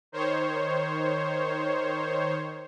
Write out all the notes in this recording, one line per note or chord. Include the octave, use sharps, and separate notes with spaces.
D#3 C5 C#5